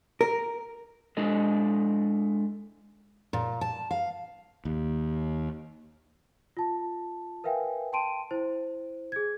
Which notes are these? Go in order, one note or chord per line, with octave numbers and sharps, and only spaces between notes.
A#4
G#3 D4 E4 A4 D#5
A#2
A5
F5
D#2
F4 A5
A#4 B4 E5 F5 G5 G#5
G5 A5 C6 D7 D#7
E4 C5
G#4 G#6